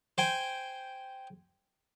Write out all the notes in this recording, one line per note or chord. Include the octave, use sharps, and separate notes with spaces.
C5 G5 G#5